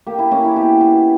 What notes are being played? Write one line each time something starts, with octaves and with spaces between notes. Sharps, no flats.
A#3 G4
E4
A#3 C#4
E4
B2 G4
B2